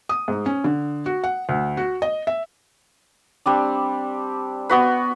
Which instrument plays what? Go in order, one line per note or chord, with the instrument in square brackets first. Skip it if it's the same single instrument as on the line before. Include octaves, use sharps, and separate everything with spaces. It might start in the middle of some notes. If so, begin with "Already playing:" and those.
[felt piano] D#6
G#2
C#4
D3
F#4
F#5
D2
F#4
D#5
E5
[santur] G3 C4 D4
B3 F#4 B4